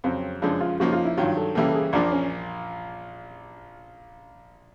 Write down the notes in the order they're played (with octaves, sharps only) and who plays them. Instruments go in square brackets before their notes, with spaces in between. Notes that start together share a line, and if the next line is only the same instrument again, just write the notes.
[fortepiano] F2 C#3 F#3 [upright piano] C4
[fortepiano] F#2 C#3 F3 G#3 [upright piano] D4
[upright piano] F4
[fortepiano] C#3 F3 A#3 D#4 [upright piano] F#4
[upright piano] F4
E4
[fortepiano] G2 D#3 F#3 [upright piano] F4
[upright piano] A4
[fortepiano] C#3 E3 G3 A#3 [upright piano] A4
[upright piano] A4
G#4
[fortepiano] A#1 A#2 F3 A#3 [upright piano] D4
[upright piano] C#4